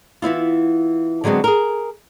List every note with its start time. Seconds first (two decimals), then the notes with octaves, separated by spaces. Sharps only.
0.22 E3 B3 E4 F4
1.24 D3 F#3 G#3 B3 C4
1.44 G#4 A#4